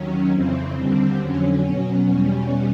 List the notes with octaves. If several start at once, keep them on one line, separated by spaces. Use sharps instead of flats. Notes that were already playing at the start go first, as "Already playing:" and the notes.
Already playing: D#2 D#3 F#3 C#4
F2 C#3 E3 C4
D#2 D3 G3
F2 D3 F#3 C#4
B2 F#3
E2 B2 G3 C#4